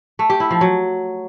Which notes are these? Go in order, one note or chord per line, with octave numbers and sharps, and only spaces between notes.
A3
G4
E4
F3
F#3